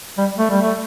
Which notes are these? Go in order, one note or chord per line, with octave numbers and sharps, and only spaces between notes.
G3
A3
G3
A3